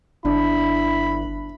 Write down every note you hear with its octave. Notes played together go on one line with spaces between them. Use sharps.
G1 D4 E4 B5